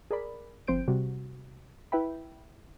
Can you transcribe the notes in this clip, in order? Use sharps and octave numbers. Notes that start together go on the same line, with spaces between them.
G#4 A#4 D5 B5
G1 F3 C4 C5 G6 D7
C3 G3 F#4
E4 B4 E5 G5 B5